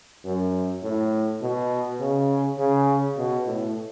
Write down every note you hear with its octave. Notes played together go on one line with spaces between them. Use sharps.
F#2
A2
B2
C#3
C#3
B2
A2